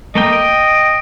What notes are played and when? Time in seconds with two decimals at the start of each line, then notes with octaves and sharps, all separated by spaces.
0.15 A3 A#3 D#5 G5
0.33 G5